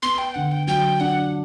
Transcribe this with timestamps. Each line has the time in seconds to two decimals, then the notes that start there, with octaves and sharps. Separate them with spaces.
0.02 B3 C6
0.18 G5
0.34 D3 F#5
0.51 G5
0.67 F#3 G5
1.00 D4 F#5